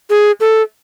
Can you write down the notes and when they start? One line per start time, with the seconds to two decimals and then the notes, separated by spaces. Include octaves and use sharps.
0.10 G#4
0.41 A4